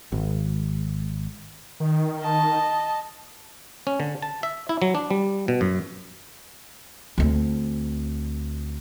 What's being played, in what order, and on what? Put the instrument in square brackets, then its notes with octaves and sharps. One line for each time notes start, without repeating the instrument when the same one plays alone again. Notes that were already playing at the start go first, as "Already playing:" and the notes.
[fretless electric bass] G#1
[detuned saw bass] D#3
[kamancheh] D#5 A5
[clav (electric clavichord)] C#4
D3
A5
E5
E4
F#3
D4
G3
B2
F#2
[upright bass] D2 C4